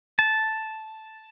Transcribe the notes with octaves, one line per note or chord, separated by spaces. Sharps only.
A5